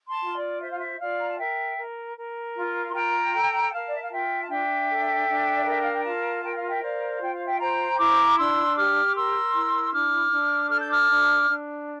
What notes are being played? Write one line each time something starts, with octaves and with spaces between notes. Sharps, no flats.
A5 C6
F4
D5
C5 E5
F5
E5
F4 D5 F5
A#5
A5
A#4 E5 G5
A#4
A#4
F4
C6
F4 G5 A#5
A4
A#4 F5 A5
D5
E5
F5
F4 E5 G5
A5
D4 E5 G5
A4
D4
D5
A#4 E5
F5
G5
F4 F5 A5
A#4 G5
F5
E5 G5
C5 D5 F5
F4 G5
F5
E5 G5
C5 G5 A#5
E4 A#5 D6
D4 C6 E6
G4 D6 F6
D6
A#4 C6 E6
E4
D4 D6 F6
D4
A4 F6
G6
D6 F6
D4
D4